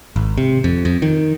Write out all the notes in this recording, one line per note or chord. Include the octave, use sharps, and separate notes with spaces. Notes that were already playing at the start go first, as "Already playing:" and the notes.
G#1
C3
F2
F2
D#3